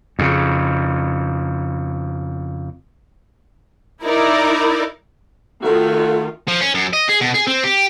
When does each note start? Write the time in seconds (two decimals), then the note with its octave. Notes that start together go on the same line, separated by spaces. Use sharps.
0.19 F2 C#3
4.03 D#4 E4 A#4 D5
5.63 D#3 A3 F4 F#4 A4
6.48 F3
6.61 C#4
6.74 F#2
6.93 D#5
7.09 G#4
7.21 B2
7.34 G#4
7.47 C4
7.64 G4